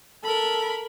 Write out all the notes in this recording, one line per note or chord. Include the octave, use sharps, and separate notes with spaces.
A4 A#4 B5